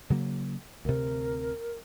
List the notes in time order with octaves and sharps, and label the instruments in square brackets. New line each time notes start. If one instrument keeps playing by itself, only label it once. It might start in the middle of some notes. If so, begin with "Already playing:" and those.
[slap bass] C#3 F#3 A#3
[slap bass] D2 C3 [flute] A#4